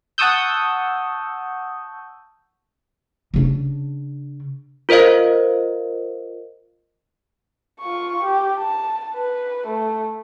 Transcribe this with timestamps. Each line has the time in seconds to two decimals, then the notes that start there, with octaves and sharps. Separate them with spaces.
0.18 F#5 A5 C#6 D#6 E6 G6
3.34 C#3 D4
4.89 F4 A#4 C5 D#5 F5
7.80 F4 C#6
8.24 G4
8.58 A5
9.15 B4
9.67 A3